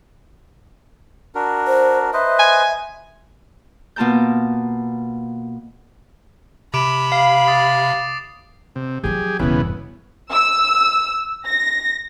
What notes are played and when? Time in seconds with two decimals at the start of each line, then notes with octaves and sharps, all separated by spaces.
1.35 D4 F#4 A#4
1.67 C5
2.13 B4 C5 D#5 E5
2.39 G#5
3.96 B2 A#3 F4 A5 A#5 G6
6.74 C3 B5 D6 D7 E7
7.12 F5 C7
7.48 D6 D#6 A6
8.76 C3
9.04 F3 F#3 G4 G#4
9.39 E1 G2 C#3 E3 B3
10.32 E6
11.48 A#6